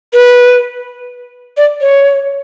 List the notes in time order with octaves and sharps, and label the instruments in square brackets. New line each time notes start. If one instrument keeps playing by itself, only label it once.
[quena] B4
D5
C#5